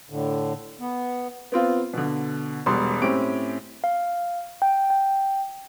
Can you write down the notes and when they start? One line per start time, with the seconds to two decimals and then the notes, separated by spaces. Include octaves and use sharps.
0.10 A2 D3
0.80 B3
1.52 B3 C4 F4
1.93 B2 D3
2.66 E1 B2 G3 C6
3.02 A2 C4 C#4 G4 D7
3.84 F5
4.62 G5
4.90 G5